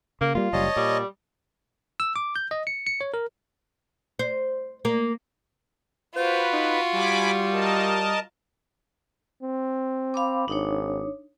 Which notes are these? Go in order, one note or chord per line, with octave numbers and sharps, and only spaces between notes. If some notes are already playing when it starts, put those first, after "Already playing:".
C#3 A#3
G3 A#3 F4
F#1 G3 C#5 D#5 A5
A#2 G3
E6
D6
G6
D#5
C#7
C#7
C#5
A#4
C5
A#3
F4 F#4 B4 C5
D#4
G3 G#5 B5 D6
A#4 D#5 A5
C4
F5 B5 D6
G#1 D4 D#4 C#5